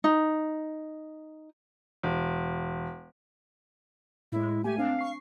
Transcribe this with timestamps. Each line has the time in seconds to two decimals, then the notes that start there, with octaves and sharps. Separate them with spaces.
0.04 D#4
2.03 E1
4.32 A2 G#3 E4
4.64 A3 G4 G#5
4.78 C4 D4 F5
4.99 C#6 C7